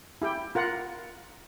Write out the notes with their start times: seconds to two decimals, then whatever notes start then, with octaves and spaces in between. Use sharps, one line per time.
0.22 E4 G4 G5
0.55 F4 A#4 F#5